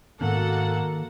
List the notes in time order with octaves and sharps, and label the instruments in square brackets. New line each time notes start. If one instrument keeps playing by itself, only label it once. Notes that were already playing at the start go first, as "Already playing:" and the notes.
[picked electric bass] G#2 B3 C#4 [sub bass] D#3 [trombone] A#3 [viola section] F#4 A4 F#5